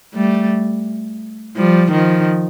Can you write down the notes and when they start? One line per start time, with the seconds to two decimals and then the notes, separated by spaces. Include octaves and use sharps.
0.14 G3 A3
1.56 F3 G3
1.92 D#3 F3